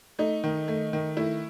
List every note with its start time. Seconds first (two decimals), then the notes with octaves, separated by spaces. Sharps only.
0.19 A3 D#4
0.44 D#3
0.68 A3
0.93 D#3
1.17 A3 E4